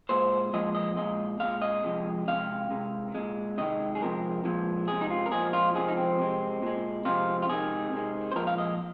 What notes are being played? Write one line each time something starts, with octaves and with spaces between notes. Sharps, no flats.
A#2 G#3 C5
A#2 F3 G#3 D#5
D#5
A#2 G#3 D#5
A#2 G#3 F5
D#5
C3 F3 G#3
C3 D#3 G#3 F5
C3 G#3
A#2 G#3
C3 D#3 G#3 D#5
G#4
C3 F3 G#3 A#4
A#2 F3 G#3
C3 G#3 G#4
D#4
F4
A#4
A#2 F3 G#3 G#4
F4
C3 F3 G#3 G#4
D#4
C4
C3 G#3
A#2 G#3
C3 F3 G#3 F4
F4
C3 D#3 G#3 G#4
C3 D#3 G#3
C5
A#2 F3 G#3 A#4
F5
D#5